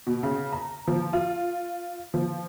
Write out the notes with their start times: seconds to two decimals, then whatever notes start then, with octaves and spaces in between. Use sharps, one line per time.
0.07 B2
0.23 C#3
0.52 A#5
0.88 F3
1.13 F4
2.14 F3